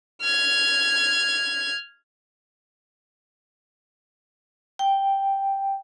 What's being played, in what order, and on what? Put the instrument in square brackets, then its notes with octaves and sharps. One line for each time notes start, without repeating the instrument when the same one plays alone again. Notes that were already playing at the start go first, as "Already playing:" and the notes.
[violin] F6 G#6
[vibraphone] G5